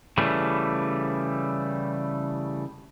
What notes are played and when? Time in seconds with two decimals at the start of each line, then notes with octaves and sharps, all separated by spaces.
0.18 C#3 E3 G3 A3